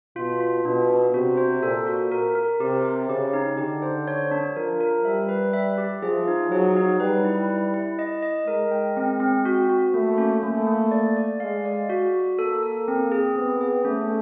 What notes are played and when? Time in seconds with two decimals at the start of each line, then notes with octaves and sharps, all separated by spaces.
0.16 B2 F4
0.40 F4
0.64 B2 D4
0.89 D4
1.14 C3 F#4
1.37 C5
1.63 A#2 A4
1.86 F#4
2.12 A#4
2.35 A#4
2.60 C3 G4
2.85 G4
3.09 C#3 G4
3.33 D#4
3.58 D3 G4
3.82 C5
4.08 C#5
4.31 D4
4.56 F3 A#4
4.81 A#4
5.05 G3 E5
5.29 B4
5.53 E5
5.78 G4
6.03 F3 G#4
6.28 D#4
6.51 F#3 G#4
6.76 D#4
7.00 G3 B4
7.25 E4
7.50 E4
7.74 E4
7.99 D#5
8.22 D#5
8.47 G#3 A#4
8.71 G5
8.97 C4
9.20 C4
9.45 F#4
9.70 F#4
9.94 A3 A#3
10.18 C#4
10.43 A3 A#3
10.67 A#3
10.91 D5
11.17 D5
11.40 G#3 F5
11.65 D5
11.90 F#4
12.14 F#4
12.38 A#3 A4
12.63 A4
12.88 C4
13.12 G#4
13.36 B3 C4
13.61 G#4
13.85 A3 C#4